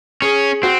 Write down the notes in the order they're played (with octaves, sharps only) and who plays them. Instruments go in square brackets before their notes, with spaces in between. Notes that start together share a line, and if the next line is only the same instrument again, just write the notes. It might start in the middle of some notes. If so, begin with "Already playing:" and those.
[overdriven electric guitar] C#4 [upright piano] G#4
[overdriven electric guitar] C4 [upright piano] F#4